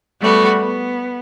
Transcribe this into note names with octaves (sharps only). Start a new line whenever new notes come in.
G3 A3 B3 F#4
B3